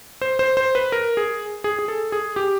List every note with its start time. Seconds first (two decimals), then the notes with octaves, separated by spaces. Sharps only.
0.21 C5
0.39 C5
0.57 C5
0.75 B4
0.92 A#4
1.17 G#4
1.64 G#4
1.79 G#4
1.88 A4
2.12 G#4
2.36 G4